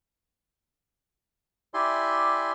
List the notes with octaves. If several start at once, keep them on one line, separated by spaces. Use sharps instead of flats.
E4 G4 D5 E5 G#5 C6